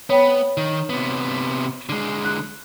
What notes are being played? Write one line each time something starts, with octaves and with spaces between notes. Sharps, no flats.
B3 C#5 G5 B5
D#3
C3 B3
D3 G#3
F#6